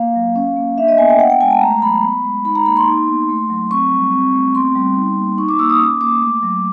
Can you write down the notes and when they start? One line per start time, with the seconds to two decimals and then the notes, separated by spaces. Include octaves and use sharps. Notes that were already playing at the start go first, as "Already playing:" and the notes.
Already playing: A#3 F5
0.15 F#3
0.36 C#4
0.57 A#3
0.78 D4 E5
0.88 D#5
0.98 B3 G#5
1.09 G5
1.20 B3 F#5
1.30 G5
1.41 G#3 G#5
1.51 A5
1.61 A3 A#5
1.82 F#3 B5
2.03 B3
2.24 G#3
2.45 D#4 B5
2.55 A#5
2.66 A#3 B5
2.77 C6
2.87 D#4
3.08 B3
3.29 A3
3.50 F#3
3.71 C4 C#6
3.92 G3
4.12 C4
4.33 A3
4.54 B3 C6
4.75 G3
4.96 D#4
5.17 A#3
5.38 D#4 C#6
5.49 D6
5.59 A#3 E6
5.70 D#6
5.79 C#4 D6
6.01 A#3 D6
6.22 A3
6.43 F#3